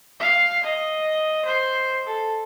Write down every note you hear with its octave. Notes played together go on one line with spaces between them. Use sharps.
F5
D#5
C5
A4